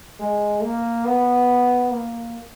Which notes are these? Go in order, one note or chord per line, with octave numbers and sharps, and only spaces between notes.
G#3
A#3
B3
A#3